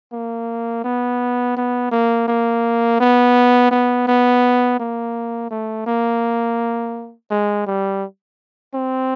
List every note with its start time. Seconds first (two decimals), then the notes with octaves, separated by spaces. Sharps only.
0.12 A#3
0.84 B3
1.56 B3
1.91 A#3
2.28 A#3
3.00 B3
3.71 B3
4.07 B3
4.80 A#3
5.51 A3
5.86 A#3
7.30 G#3
7.66 G3
8.74 C4